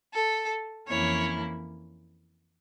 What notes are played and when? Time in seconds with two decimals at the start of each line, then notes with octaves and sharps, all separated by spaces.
0.14 A4
0.88 F2 E3 A#3 C#4 E4 C#5